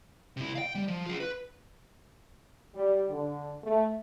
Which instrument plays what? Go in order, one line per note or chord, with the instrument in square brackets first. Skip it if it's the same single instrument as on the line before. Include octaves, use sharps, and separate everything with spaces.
[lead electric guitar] C3 E4
F5 G5
G3
F3
F4 G#4
B4
[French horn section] G3
D3
A3